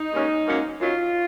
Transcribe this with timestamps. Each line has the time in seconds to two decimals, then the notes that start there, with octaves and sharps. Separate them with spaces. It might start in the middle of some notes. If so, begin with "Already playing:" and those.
Already playing: D#4
0.13 D#2 C#3 G#3 C#4
0.45 G#2 F#3 A#3 C#4
0.80 F#2 D#3 F#3 F4